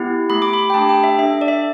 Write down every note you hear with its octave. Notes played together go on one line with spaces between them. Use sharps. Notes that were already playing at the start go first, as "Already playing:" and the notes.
Already playing: B3 E4 G4
A3 G4 B5
D6
B5
G5
A3 D4 G4 A5
G5
E5
D4 A4 E5
D5
E5